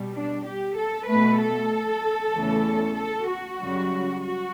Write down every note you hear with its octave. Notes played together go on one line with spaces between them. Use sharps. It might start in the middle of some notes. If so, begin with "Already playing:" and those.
Already playing: B2 G3
D4
G4
A4
B2 A3 B4
A4
E2 C#3 E3 A3
A4
F#4
F#2 C#3 G3
F#4